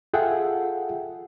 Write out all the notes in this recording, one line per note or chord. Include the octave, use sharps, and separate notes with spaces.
F4 G#4 A4 E5 F#5 G5